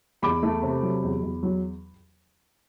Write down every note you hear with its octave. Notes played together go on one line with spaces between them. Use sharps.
E2 B5 D6
A3
C3
F#3
E2
E2
F#3